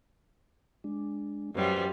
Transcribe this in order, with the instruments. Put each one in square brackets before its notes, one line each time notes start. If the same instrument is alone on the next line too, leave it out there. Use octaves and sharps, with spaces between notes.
[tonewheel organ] G#3 D4
[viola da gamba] F#2 G3 F4 [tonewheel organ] F#4 B4 C5